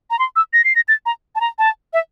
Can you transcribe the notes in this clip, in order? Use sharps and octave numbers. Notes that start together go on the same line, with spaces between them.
A#5
C6
E6
A#6
C7
A#6
A6
A#5
A5
A#5
A5
E5